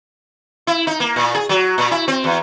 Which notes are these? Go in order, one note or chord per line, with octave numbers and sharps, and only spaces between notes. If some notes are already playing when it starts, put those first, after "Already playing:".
E4
D#4
A#3
A#2
G#4
F#3
A#2
E4
C4
E2